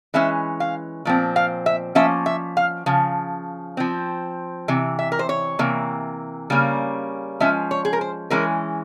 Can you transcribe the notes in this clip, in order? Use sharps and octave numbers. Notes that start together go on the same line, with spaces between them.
E3 G#3 C#4 E5
F5
A#2 F3 C4
F5
E5
F3 A#3 C#4 E5
E5
F5
C#3 F3
F3 C4
C3 E3
E5
A#4
C5
C#5
C3 E3 A#3
C#3 G3 A#3 C#4
F3 G#3 C#4 E5
C#5
G#4
A#4
C5
E3 G#3 C#4 A#4